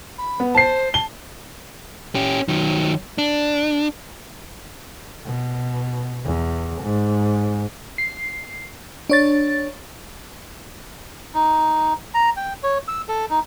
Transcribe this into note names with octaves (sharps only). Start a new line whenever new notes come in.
B5
B3
C5 A5 C7
A5 G7
C#4 G4
D#3 F#3
D4
B2
E2
G#2
C7
D4 C#5 A6
D#4
A#5
G5
C#5
E6
A4
D#4